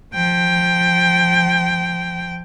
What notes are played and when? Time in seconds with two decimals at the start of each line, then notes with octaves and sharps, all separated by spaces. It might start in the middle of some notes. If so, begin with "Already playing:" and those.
0.14 F3 G5